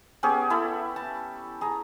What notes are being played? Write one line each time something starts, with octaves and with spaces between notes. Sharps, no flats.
B3 C#4 G4 G#4
E4 A4 B5
A5
G#4 A#5